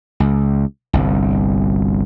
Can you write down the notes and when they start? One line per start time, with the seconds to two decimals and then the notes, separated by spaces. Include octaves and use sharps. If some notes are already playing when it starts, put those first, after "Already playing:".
0.20 C#2
0.93 G1 C2